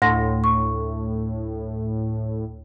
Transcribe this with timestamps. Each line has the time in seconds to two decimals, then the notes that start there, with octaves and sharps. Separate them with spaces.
0.02 D2 A2 C6 A#6
0.44 C#6